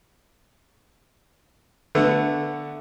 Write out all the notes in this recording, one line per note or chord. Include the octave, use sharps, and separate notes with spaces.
D3 A3 B3